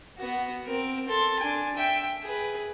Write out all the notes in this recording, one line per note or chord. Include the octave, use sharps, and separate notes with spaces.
B3 F#4
C4 A#4
A4 C6
D4 G#5
E5 G5
G#4 B4